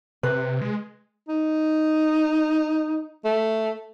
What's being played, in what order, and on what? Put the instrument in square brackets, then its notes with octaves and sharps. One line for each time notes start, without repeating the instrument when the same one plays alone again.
[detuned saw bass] C3 [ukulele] B4
[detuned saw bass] G#3
[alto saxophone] D#4
A3